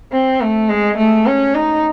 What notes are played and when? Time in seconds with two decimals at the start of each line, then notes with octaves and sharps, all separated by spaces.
0.12 C4
0.41 A3
0.69 G#3
0.98 A3
1.27 C#4
1.55 D#4